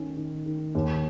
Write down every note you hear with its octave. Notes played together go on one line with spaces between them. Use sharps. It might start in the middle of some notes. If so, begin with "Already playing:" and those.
Already playing: D#3 C#4
D#3
D#3
D#2